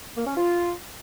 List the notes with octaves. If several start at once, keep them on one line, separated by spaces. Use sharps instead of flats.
A#3
C#4
F4